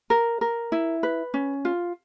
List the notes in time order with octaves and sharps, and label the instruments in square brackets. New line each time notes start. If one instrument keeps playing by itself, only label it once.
[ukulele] A#4
A#4
E4
B4
C#4
F4